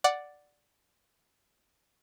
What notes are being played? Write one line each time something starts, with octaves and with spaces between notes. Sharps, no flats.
D5 F#5